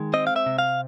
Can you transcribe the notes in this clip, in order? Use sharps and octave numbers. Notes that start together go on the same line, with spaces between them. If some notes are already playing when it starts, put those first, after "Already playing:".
Already playing: D#3 G#3
C4 D#5
F5
E5
C3
F5